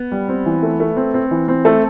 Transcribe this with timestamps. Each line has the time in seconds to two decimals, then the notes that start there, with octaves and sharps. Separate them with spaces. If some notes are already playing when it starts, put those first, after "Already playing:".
Already playing: B3
0.11 G3
0.29 C4
0.46 E3
0.63 A3
0.80 A3
0.96 C4
1.14 C4
1.31 E3
1.48 C4
1.65 A3 A4